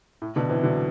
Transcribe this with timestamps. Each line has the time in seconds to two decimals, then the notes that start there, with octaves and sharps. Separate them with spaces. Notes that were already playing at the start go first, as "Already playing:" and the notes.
0.22 A2
0.36 B2 D3
0.49 C3 E3
0.63 D3 F#3